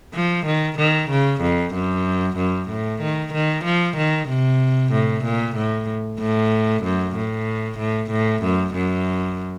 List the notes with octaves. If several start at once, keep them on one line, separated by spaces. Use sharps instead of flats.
F3
D#3
D#3
C#3
F2
F#2
F#2
A2
D#3
D#3
F3
D#3
C3
A2
A#2
A2
A2
F#2
A2
A2
A2
F#2
F#2